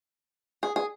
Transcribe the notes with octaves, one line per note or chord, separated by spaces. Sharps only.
G#4
G#4